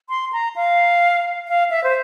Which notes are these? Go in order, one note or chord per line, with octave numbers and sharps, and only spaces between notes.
C6
A#5
F5
F5
E5
C5